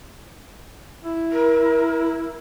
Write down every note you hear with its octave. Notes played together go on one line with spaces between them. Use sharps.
E4
A#4